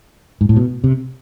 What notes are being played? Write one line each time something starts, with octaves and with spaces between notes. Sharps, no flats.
G#2
A2
B2
C3